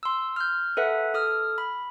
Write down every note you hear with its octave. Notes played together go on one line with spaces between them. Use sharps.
C6 E6
F6 G6
A4 B4 E5 F#5
A4 D#6 F6
B5